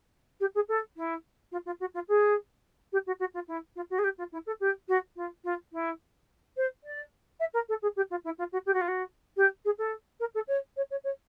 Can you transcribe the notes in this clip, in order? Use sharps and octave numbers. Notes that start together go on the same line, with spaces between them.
G4
G#4
A4
E4
F4
F4
F#4
F4
G#4
G4
F#4
F#4
F4
E4
F4
F#4
G#4
G4
F4
E4
A4
G4
F#4
F4
F4
E4
C5
D5
E5
A#4
A4
G#4
G4
F4
E4
F4
F#4
G4
F#4
F4
F#4
G4
G#4
A4
A#4
A4
C#5
C#5
C#5
C#5